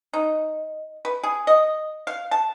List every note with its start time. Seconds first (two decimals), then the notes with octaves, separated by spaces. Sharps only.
0.14 D#4
1.05 B4
1.24 G#4
1.47 D#5
2.07 F5
2.31 A5